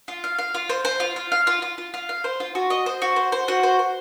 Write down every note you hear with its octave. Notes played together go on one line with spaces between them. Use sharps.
F4
F5
F5
F4
C5
C5
F4
F4
F5
F4
F4
F4
F4
F5
C5
F4
F#4
D#5
C5
F#4
C5
C5
F#4
C5
C5